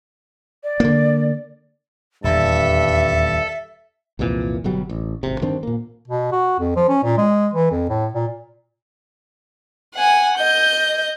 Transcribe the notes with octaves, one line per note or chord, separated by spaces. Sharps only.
D5
D3 A#3
D#1 E2 G2 A4 E5
C2 F2 A#2 E3
G1 B2 F#3 G3
A1
G#1 C3
G2 D#3 C4 D4
A#2 A#3
B2
F#4
F2
F3
C#4
A#2
G#3
E3
F2
A2
A#2
F#5 G#5
D#5 G6